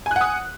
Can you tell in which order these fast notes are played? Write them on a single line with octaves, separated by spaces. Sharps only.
G#5 F#6 F#5 D#6